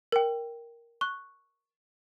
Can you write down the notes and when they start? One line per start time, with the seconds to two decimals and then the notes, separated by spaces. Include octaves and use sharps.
0.12 A#4 G5
1.01 C#6 F#6